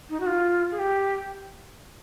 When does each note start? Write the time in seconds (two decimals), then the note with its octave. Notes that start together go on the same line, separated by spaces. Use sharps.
0.10 D#4
0.20 F#4
0.27 F4
0.72 G#4
0.79 G4